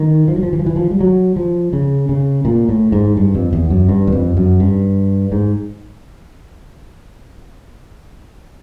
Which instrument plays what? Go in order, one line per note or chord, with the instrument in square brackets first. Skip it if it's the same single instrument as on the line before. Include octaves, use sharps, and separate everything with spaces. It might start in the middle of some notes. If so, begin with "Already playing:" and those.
Already playing: [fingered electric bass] D#3
F3
F#3
F3
E3
F3
E3
F3
G3
F#3
F3
C#3
C#3
A#2
A2
G#2
G2
F2
E2
F#2
G2
E2
F2
F#2
G2
G#2